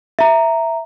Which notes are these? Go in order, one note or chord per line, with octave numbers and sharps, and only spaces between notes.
E5 A#5